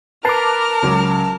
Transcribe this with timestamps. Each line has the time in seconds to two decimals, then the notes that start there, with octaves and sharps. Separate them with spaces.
0.25 A#4 B4 A5 D6 F6 C7
0.83 C#2 F#3 C#4